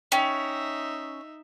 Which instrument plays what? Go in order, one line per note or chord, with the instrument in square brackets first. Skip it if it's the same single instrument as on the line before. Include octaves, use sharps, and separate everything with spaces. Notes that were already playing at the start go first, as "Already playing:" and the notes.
[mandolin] C#4 [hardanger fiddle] D#4 E5 [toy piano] G5